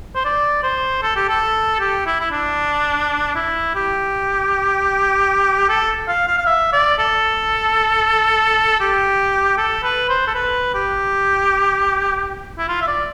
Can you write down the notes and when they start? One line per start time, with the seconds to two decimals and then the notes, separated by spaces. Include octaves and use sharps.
0.15 C5
0.25 D5
0.63 C5
1.02 A4
1.16 G4
1.29 A4
1.80 G4
2.06 E4
2.20 E4
2.31 D4
3.35 E4
3.75 G4
5.69 A4
6.08 F5
6.27 F5
6.38 F5
6.47 E5
6.73 D5
6.98 A4
8.80 G4
9.57 A4
9.83 B4
10.09 C5
10.27 A4
10.35 B4
10.75 G4
12.58 E4
12.68 F4
12.81 E5
12.88 D5